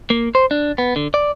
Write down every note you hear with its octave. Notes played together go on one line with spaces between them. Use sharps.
A#3
C5
D4
B3
D3
D5